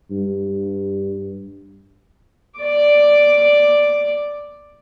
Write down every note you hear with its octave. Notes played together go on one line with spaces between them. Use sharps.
G2
D5 D6